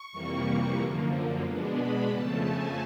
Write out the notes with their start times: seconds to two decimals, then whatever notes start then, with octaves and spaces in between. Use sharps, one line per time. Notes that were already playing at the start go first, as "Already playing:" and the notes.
Already playing: C#6
0.12 F2 C3 E3 G3 A#3
0.78 F#2 D3 F3 A#3
1.43 B2 G#3 B3 D4
1.76 B5
2.09 F2 C#3 F3 A3 A5
2.42 G#5